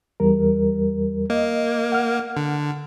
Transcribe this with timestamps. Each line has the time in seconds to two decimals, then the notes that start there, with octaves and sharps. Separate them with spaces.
0.20 E2 G3 A#4
1.30 A#3 D#5
1.92 F#5 F6
2.37 D3